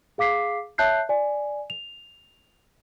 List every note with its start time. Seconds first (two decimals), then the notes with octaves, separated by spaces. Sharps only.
0.18 G#4 F5 D6 B6 C7
0.78 C#5 E5 A5 F#6 G6 C7
1.09 D5 G#5
1.70 F7